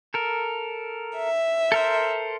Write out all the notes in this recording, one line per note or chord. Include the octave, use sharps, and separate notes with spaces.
A4 A#4
E5
A4 A#4 C5